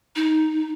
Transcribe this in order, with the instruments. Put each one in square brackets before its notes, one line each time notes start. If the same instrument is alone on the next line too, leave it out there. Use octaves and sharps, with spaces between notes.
[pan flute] D#4